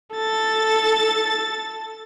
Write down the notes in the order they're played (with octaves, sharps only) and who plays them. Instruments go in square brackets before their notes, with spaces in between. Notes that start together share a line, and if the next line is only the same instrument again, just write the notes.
[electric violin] A4 A6